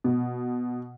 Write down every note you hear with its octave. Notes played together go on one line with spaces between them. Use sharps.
B2